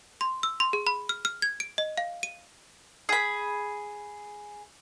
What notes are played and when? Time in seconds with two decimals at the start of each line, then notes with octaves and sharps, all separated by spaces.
0.21 C6
0.43 E6
0.60 C6
0.73 G#4
0.87 B5
1.09 F6
1.25 F6
1.42 G#6
1.60 D7
1.78 D#5
1.97 F5
2.23 D#7
3.09 G#4 B5